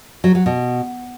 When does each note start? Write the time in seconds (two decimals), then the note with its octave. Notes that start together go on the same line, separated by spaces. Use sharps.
0.24 F#3
0.35 F#3
0.46 B2